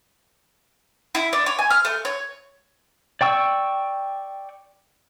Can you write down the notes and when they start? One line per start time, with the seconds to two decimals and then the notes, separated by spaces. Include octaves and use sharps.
1.15 E4
1.33 D4
1.46 C#5
1.59 G#5
1.70 F6
1.85 A3
2.05 C#5
3.21 D5 G5 C#6 E6